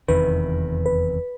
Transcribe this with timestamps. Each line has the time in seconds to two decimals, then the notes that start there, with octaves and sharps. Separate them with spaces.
0.08 F1 E2 C3 D#3 B4
0.86 B4